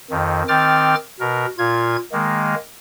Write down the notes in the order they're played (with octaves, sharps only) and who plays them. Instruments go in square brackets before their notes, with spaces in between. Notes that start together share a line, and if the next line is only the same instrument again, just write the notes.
[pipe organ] F2 D#3
D#3 C4 G5 D6 F6 A6
B2 A#4
A#2 F4 G#6
D#3 G#3 A#3